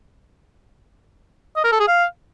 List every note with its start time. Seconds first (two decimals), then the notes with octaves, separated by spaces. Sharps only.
1.56 D#5
1.64 A#4
1.72 A4
1.80 G#4
1.88 F5